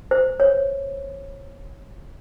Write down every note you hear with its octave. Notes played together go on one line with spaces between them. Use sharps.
C5
C#5